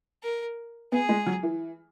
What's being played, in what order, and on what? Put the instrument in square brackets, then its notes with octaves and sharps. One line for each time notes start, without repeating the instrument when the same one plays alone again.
[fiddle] A#4
[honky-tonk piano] B3 [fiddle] G#4
[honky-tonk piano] G#3
F#3
E3